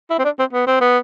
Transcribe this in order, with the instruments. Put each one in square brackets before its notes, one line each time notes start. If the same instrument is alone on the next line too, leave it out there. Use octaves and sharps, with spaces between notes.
[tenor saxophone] E4
C4
D4
C4
B3
C4
B3